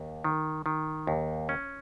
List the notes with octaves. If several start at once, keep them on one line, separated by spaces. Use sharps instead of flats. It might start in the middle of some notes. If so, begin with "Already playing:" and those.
Already playing: D#2
D#3
D#3
D#2
C#4